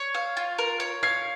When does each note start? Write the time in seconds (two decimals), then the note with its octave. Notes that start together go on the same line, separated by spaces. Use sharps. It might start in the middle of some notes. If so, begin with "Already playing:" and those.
Already playing: C#5
0.15 F5
0.37 F4
0.59 A#4
0.80 C#5
1.03 F5 G#6 C7